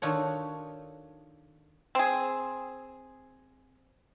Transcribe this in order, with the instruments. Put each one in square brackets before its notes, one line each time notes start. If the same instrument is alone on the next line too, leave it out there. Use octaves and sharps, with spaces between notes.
[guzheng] D#3 D4 F4 F#4 A4 C#5
[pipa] C4 G#4